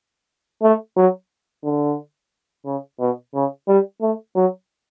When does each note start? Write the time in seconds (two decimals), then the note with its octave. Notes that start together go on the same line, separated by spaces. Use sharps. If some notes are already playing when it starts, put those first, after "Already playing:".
0.62 A3
0.96 F#3
1.64 D3
2.66 C#3
3.00 B2
3.34 C#3
3.68 G3
4.01 A3
4.36 F#3